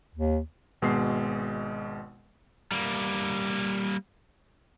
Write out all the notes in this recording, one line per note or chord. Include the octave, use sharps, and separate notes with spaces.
D#2
G#1 B2 G#3 D#5 C7
G3 A#3